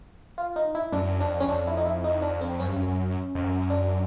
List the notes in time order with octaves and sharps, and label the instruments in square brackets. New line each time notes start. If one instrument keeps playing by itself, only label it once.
[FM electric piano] F4
D#4
E4
[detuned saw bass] F#2 [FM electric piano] D4
[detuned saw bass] F2 [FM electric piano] D4
[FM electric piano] C#4
[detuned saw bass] F2 [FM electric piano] D4
[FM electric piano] E4
D#4
E4
D#4
D4
C4
[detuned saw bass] F#2 [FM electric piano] C#4
[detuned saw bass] G2
F#2
F#2
F2
F#2
[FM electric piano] D4